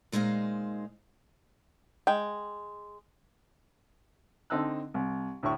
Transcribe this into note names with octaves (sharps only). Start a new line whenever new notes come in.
A#2 G#3 D#4 C5 F5
G#3 G5
D3 C4 D#4 A5 E6 F#6
C2
D2 A2 E4 C#6